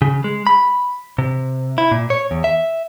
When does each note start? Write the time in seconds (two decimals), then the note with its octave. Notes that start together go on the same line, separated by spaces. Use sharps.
0.02 C#3
0.24 G#3
0.47 B5
1.18 C3
1.78 E4
1.92 A#2
2.10 C#5
2.31 E2
2.44 E5